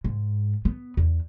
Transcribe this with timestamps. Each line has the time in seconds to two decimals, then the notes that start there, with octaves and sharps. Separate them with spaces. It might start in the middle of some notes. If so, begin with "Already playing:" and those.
0.04 G#2
0.65 B3
0.97 E2